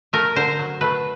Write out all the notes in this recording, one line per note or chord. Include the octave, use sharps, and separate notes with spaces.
A3 A#4
D3 C5
F#3
A3 B4